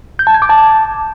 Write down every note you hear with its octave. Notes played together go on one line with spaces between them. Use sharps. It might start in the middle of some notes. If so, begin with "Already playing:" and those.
G6
A5
G#6
D6
A5